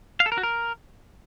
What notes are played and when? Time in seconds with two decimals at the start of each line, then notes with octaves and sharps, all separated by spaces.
0.20 F5
0.26 A4
0.32 A#4
0.38 F#4
0.43 A#4